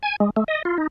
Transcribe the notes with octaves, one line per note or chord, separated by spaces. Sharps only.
G#5
G#3
A3
D#5
F4
D#4